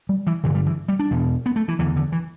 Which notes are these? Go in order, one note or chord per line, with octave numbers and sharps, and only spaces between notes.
G3
E3
G2 D3 E3
G3
E3
G3
D4
E2 B2
B3
A3
E3
E2 D3 E3
D3
E3